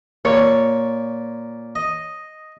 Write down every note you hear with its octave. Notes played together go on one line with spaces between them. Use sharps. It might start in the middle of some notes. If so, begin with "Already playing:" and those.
A#2 A#3 C#5
D#5